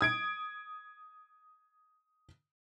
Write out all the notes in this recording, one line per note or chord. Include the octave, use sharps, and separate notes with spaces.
D#6 G#6 D7